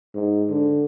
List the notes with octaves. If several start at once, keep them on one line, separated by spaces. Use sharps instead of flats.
G#2
D3